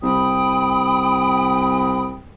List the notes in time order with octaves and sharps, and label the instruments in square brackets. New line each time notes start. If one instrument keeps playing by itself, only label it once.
[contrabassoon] C2 [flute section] G5 B5 D#6